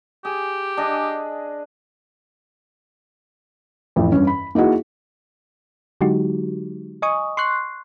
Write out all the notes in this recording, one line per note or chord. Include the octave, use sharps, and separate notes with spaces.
G4 G#4
D4 G#4 D#5
A1 F2
G2 C#4
B5
A#3 D#4 E4 F#4 G#4
D3 F#3 G#3 D#4 F#4 G4
D#5 G#5 C#6 D#6
C6 C#6 F#6 C7